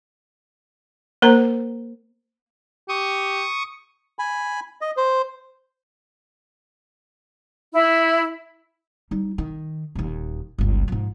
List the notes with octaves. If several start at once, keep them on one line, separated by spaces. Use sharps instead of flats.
A#3 A#4 C5 A#5
G4 C#6 D#6
G#5 B5
D#5
C5
E4
G3 D#4
D#3
D#1 D#2
G1 C#2
G#2 F3